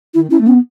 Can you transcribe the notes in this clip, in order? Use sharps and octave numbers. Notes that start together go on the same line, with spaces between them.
D#3 E4
C#4 E4
A3
B3 C#4